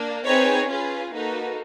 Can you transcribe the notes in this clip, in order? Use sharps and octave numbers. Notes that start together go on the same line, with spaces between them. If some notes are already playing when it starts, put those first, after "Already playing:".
Already playing: A#3 D4
C4 D#4 G#4 B4 C#5
C#4 F4 G#4 B4
A#3 D#4 F#4 A4 B4